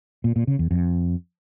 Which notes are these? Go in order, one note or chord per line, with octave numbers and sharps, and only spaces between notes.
A#2
A#2
C#3
E2
F2